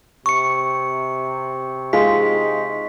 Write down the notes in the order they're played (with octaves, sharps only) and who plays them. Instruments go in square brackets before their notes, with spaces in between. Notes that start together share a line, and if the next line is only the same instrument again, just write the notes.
[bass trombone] C3 [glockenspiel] C#6 C#7
[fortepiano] G#3 F4 [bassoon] D#4 [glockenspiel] B6